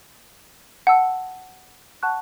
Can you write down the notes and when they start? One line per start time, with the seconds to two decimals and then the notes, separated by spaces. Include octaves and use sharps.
0.87 F#5 A5 E6
2.03 F#5 A5 C#6 F#6